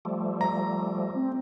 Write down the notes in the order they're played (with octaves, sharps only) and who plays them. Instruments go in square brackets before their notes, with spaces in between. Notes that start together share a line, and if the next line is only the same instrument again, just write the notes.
[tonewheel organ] F3 G3 A3
[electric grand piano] A#5
[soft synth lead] C4